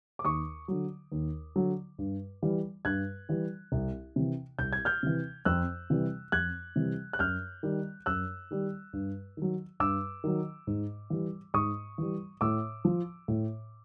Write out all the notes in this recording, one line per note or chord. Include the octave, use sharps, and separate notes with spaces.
D6
D#2 C#6 D#6
D3 F#3
D#2
D3 F#3
G2
E3 G3
G2 F#6 G#6
E3 G3
C2
C3 E3
C2 G6
G#6
F6 G6
C3 E3
F2 E6 F#6
C3 E3 G3
F2 F#6 G#6
C3 E3 G3
F#6
F#2 F6 G6
D#3 G3
F#2 E6 F#6
D#3 G3
G2
D#3 F#3
G2 D6 E6
D#3 F#3
G#2
E3 G3
G#2 C#6 D#6
E3 G3
A2 D6 E6
F3
A2